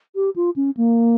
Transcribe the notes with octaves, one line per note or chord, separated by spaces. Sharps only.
G4
F4
C#4
A#3